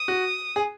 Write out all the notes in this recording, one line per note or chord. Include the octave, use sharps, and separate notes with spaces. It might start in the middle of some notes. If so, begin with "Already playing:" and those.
Already playing: D#6
F#4
G#4